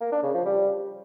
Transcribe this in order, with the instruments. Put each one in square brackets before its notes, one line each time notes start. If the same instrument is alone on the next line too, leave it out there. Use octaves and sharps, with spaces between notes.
[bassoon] A#3
D4
C#3
F3
G3